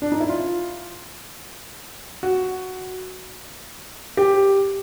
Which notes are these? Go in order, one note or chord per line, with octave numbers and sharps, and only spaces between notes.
D4
D#4
E4
F4
F#4
G4